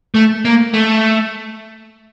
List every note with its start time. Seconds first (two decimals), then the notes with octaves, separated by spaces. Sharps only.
0.15 A3
0.45 A#3
0.73 A3